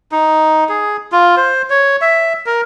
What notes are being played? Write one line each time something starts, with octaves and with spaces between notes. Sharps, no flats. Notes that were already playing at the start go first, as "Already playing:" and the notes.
D#4
G#4
F4
C5
C#5
E5
A#4